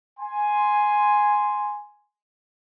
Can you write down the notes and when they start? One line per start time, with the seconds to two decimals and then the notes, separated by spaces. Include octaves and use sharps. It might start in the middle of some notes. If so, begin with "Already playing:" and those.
0.19 G#5 C6